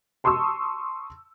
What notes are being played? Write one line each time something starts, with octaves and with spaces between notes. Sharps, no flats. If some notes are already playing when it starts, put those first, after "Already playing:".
A5 C6 C#6 D#6 E6